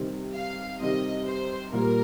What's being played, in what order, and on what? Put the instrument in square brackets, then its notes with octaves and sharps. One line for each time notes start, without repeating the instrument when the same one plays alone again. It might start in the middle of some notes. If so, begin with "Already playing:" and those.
Already playing: [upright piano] C3 D#3 G3 C4
[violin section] F5
[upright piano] C3 D#3 G3 C4 [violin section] D#5
[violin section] C5
[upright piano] A#2 G3 A#3 [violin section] A#4